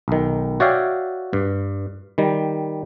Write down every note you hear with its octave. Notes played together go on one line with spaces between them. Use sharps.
B1 D#3
F#4 C#5 D5 E5 F5 G5
G2
D#3 G3